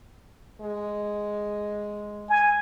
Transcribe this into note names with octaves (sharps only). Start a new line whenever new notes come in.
G#3
G#5